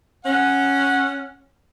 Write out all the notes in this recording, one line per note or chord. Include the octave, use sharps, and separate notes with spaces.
C#4 F#5